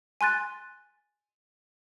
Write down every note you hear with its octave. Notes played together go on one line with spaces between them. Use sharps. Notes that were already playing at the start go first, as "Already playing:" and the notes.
G#5 C6 F#6 A6